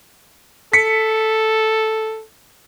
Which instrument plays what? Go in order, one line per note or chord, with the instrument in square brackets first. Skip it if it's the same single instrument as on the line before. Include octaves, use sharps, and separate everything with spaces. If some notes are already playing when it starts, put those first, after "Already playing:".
[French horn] A4 [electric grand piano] B6 C#7